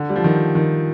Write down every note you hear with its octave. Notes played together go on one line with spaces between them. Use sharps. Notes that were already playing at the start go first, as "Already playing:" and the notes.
Already playing: D3
G3
F3
D#3
D#3